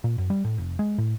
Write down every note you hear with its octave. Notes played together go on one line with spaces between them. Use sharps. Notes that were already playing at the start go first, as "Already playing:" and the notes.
A#2
F#2
G3
A2
F1
G#3
A2